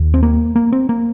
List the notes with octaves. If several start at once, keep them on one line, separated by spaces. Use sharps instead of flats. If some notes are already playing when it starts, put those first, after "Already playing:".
Already playing: D#2
C4
A#3
A#3
C4
A#3